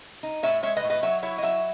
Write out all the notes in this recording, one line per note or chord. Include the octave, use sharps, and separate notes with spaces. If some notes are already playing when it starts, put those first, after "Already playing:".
D#4
A2 C#5 E5
G#3 C#5 E5
B4 D#5
A2
B4 D#5
F#3 C#5 E5
E4 C#5 E5
D#5
F#3 C#5 E5